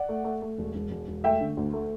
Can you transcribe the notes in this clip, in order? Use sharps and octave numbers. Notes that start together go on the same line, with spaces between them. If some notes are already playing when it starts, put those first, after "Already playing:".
Already playing: D5 F#5
A3
A3
A3
E1
E1
E1
E1
A3 E5 G5
D3
D2
A3